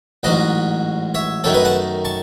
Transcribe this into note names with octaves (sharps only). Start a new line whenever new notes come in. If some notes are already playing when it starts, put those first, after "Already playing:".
A1 G#2 F#3 C#4 D#5 F#5
C#5 E5
F#2 D#3 A3 D#4 A4 C#5
B4 D#5
F#5 A5
A5 C#6